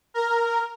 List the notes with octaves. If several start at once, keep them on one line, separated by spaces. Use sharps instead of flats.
A#4